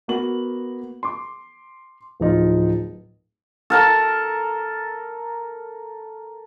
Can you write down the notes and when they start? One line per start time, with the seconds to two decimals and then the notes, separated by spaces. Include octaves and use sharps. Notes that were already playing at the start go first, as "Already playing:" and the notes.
0.08 A#3 B3 F#4 F#7
1.03 C6 D6
2.20 D1 F3 D#4 F4
3.70 A4 A#4 A5